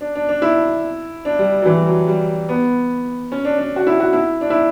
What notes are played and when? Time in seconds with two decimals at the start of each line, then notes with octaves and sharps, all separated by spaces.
0.01 D4
0.15 D4
0.29 D4
0.42 E4
1.25 D4
1.39 G3
1.62 F#3
1.66 E3
1.77 G3
1.86 F#3
2.07 G3
2.49 B3
3.32 C#4
3.45 D4
3.58 D4
3.76 F#4
3.87 E4
4.00 F#4
4.13 E4
4.41 D4
4.50 E4